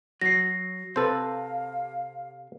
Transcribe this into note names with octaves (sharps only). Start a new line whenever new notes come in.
F#3 A#6 C7
C3 A4 B4 C5 F5